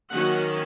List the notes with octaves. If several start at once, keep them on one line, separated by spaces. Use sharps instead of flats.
D#3 F#3 A#3 C#4 F#4 F#5